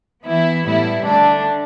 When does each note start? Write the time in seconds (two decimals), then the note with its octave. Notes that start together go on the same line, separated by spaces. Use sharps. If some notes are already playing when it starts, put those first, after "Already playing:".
0.24 E3 B3 E4
0.64 A2 G3 B3 E4
1.03 D3 A3 D4